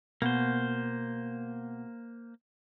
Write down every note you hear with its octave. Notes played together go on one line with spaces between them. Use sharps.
B2 A#3 C5